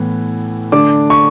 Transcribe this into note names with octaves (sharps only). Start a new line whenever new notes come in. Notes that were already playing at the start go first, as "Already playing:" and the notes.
Already playing: A2 E3 B3
D3 A3 D4 D6
C#6